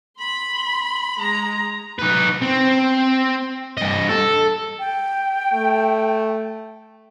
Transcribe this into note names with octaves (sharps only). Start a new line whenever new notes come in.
B5 C6
G#3 A#5
D#4 B4
C4
G2 D#5
A4
G5
A3